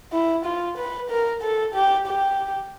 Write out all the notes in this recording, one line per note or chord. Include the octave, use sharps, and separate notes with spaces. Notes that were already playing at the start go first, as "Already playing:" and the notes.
E4
F4
B4
A#4
A4
G4
G4